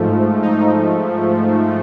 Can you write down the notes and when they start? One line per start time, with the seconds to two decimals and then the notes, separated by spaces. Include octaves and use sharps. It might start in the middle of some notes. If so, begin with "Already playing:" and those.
Already playing: G#2 F3 A3
0.42 D#4